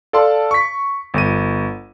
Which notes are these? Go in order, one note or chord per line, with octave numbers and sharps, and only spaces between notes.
A4 D5 F5 A5 C6
C#6 B6
G1 D#7